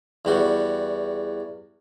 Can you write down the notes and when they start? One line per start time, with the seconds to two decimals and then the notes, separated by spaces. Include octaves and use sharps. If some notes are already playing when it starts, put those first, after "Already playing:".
0.25 E2 G3 F#4